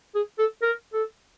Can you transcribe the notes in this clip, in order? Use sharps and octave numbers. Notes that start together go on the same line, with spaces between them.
G#4
A4
A#4
A4